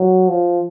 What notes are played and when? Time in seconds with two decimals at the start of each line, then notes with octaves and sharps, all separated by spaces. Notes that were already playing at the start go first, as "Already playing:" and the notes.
Already playing: F#3
0.28 F3